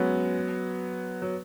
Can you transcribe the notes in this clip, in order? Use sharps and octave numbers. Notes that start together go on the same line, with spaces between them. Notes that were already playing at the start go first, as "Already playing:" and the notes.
Already playing: F#3 G#3 B3 C#4
F#3